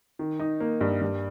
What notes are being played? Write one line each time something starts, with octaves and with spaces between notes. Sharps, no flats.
D#3
D#4
A#3
G2
G2